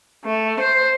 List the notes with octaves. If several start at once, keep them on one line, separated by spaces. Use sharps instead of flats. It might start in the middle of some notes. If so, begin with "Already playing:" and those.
A3
C5